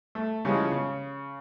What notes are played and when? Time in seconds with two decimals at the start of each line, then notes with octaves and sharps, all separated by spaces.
0.15 A3
0.45 C#3 E3 F3 G3 G#3
0.72 C#3